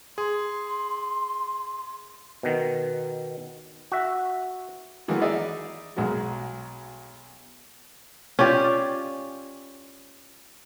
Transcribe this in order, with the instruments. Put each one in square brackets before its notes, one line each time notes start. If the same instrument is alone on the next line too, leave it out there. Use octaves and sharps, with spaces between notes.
[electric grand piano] G#4 [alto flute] C6
[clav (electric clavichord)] B2 D#3
F#4 E5
[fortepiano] D#3 E3 F#3 G#3 A#3 B3
D#4 G#4 D5 E5
B1 G#3 A#3 F#4
[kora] C#4 F4 G4 D5